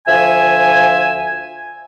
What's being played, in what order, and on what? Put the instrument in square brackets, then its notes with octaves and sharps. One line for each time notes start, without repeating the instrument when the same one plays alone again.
[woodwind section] D2 F3 E5 G#5